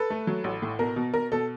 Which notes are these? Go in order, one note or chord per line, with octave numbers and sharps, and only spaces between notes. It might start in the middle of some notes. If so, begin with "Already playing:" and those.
Already playing: A4 B4
A3
F#3
A1
A2
B2 A#4
B2
B2 A#4
B2 A4